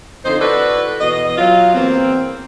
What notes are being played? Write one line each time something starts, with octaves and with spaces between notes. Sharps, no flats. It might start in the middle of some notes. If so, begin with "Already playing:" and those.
F2 D3 D#4 C5
E4 F#4 A4 B4 D5
E2 B2 D#5
F#3 F4
E2 A#3 C4